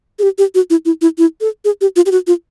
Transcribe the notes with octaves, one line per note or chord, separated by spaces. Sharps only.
G#4
G4
G4
F#4
E4
E4
E4
E4
A4
G#4
G4
F4
G4
F#4
F4